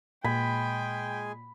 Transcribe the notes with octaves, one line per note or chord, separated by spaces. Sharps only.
A#2 G#3 G#4 G5 G#5 B5